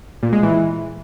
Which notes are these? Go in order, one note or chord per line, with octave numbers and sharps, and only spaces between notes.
A#2
G#3
E3